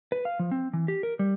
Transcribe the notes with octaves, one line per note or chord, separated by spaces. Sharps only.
B4
F5
F3
C4
E3
G4
A#4
G3